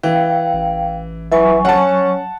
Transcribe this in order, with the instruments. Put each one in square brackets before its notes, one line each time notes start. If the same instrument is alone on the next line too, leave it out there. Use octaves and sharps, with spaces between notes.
[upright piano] E3 [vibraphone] F5 G5
[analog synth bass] A1
[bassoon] E3 [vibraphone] F#3 G#5 C#6
[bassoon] C#4 [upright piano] F#5 A5